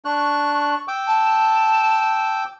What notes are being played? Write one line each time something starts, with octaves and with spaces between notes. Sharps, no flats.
D4 C#6 F#6
G5 D6 E6
A5